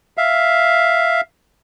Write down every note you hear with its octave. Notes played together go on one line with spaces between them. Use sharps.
E5 F5